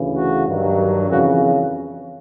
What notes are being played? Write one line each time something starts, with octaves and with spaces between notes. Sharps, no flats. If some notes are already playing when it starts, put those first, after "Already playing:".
Already playing: D2 C#3 E3
F#4
G2 D#3 F#3
F2 C#3 E3 F#4